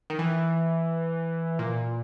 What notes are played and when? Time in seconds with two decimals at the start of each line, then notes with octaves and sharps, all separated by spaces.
0.10 D#3
0.19 E3
1.59 A#2